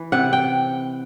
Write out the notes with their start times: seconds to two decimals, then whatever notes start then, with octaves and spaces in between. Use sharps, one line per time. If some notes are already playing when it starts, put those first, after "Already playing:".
Already playing: E3
0.12 C3 F#5
0.33 G5